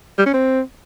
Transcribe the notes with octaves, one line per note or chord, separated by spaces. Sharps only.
G3
C#4
C4